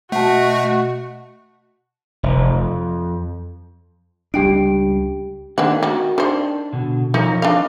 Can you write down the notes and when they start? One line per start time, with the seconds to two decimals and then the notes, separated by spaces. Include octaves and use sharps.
0.12 B2 A3 F#4 F#5 A5
2.23 F1
2.50 F2
4.34 C#2 G3 D4 G4 G5 D7
5.58 D#3 A3 A#3 C4 D4 F#5
5.83 D#3 F#4
6.18 D#3 D4 C5
6.73 B2 D3
7.14 F3 D#4 A#4 C#5
7.42 D4 D#4 F5